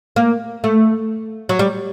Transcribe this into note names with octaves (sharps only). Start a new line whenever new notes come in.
A#3
A3
F#3
G3